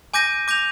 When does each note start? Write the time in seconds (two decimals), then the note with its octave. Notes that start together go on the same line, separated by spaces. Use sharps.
0.14 G#5 D6 G6 A#6 D#7
0.48 D6 G6 A#6 F7